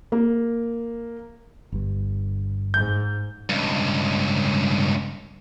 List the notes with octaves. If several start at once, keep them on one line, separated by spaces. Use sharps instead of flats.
A#3
G1 G2
G#2 G6
C#2 G2